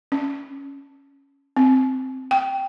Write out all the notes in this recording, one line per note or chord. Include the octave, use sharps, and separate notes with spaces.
C#4
C4
G5